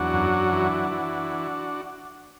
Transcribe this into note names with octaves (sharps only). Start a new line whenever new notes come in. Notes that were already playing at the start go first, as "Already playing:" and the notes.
Already playing: E2 F#3 D4 F#4
F#2
E3
E3